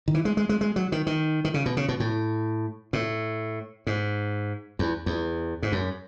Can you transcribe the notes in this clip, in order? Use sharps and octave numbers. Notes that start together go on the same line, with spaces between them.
D#3
E3
G#3
G#3
G#3
G#3
F#3
D#3
D#3
D#3
C#3
B2
C#3
B2
A2
A2
G#2
E2
E2
G#2
F#2